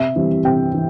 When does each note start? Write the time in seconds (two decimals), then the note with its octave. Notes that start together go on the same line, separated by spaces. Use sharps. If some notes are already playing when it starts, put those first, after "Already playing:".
Already playing: C3 E5
0.16 E3 G3 C4
0.45 C3 G5
0.74 E3